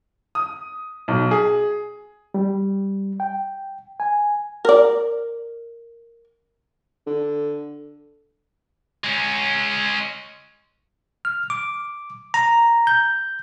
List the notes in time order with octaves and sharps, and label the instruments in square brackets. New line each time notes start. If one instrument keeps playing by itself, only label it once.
[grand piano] D#6
B1
G#4
[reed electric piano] G3
G5
G#5
[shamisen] A#4 D5
[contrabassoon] D3
[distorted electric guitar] G#3 C#4
[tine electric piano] F6
D6
A#5
G6